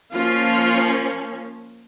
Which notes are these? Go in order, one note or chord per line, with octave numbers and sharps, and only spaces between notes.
F3 A#3 C#4 F4